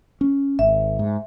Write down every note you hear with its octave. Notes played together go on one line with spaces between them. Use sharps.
C#4
G#1 E5
G#2